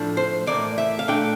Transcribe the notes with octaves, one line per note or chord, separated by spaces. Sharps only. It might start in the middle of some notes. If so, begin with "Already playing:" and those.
Already playing: A2 F3 A3 D4
C5
A2 E3 A#3 D5
E5
F5
A#2 A3 D4 G5